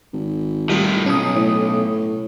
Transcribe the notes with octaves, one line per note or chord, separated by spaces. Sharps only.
G#1
A2 D#3 G3 F4
B1 C#4 D#6
A2